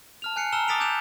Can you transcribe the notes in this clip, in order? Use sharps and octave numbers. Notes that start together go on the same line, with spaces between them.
A5 F6 F7
G#5 F#6 C7 C#7
A5 A#5 E6 F6 E7 G7
D6 D#6 A6 B6 D7 F7
D6 F#6 G6 D7 E7 F7